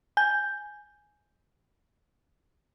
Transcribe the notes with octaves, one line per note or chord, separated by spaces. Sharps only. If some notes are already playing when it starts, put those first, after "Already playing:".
G#5 G6